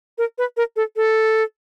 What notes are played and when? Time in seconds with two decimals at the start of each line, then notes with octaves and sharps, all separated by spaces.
0.18 A#4
0.38 B4
0.57 A#4
0.76 A4
0.96 A4